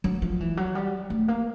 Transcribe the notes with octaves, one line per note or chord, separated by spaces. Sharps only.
F#3
F3
E3
F#3
G3
A3
A#3